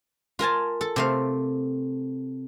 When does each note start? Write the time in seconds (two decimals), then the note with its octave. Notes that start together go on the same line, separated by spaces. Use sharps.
0.39 F4 A#4 G#5 A5
0.81 A4
0.96 C3 A3 F5